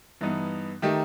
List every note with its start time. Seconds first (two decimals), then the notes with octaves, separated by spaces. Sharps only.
0.21 G2 E3 B3 D#4
0.82 D#3 A3 D#4 G4